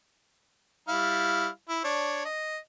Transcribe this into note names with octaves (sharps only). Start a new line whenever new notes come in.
G3 E4 F5
E4
D4 C#5
D#5